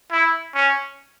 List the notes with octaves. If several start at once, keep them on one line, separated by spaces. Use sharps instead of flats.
E4
C#4